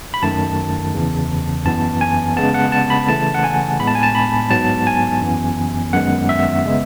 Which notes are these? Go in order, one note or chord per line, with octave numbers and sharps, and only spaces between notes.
B5
F#2 D#3 A3 A5
E2 C#3 E3
F#2 E3 B3 A5
G#5
C#3 G#3 B3 A5
F#5
A5
B5
C#3 E3 A3 A5
F#5
G#5
A2 G#3 B3 B5
A5
G#5
A5
B5
G#2 F#3 B3 A5
G#5
F#2 E3 B3
F#2 D#3 G#3 B3 F#5
E5
C#3 G#3 B3